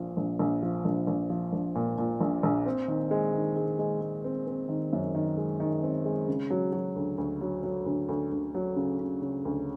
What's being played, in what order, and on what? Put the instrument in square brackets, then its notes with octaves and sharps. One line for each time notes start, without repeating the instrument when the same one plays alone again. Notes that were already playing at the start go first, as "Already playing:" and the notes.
Already playing: [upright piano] A#1 A#2 F3
A#1
A#1
F3
A#1
A#1
F3
A#1
A#2
A#2
A#1
A#1
C4
D#3
G#3
D#3
G#3
G#3
G#3
C4
C4
D#3
F#2
D#3
G#3
D#3
C4
G#3
C#3
F#3
F#3
D2
D2
F#3
F#3
D2
D2
D2
F#3
C#3
C#3
C#3
D2